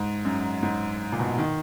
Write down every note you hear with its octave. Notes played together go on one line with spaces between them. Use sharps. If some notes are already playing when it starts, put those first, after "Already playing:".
Already playing: G#2
F#2
G#2
A#2
B2
D#3